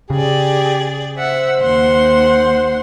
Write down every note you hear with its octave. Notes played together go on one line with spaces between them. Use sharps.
C#3 G4 G#4 D5
C5 E5 F#5 E6
D#2 F#5 C6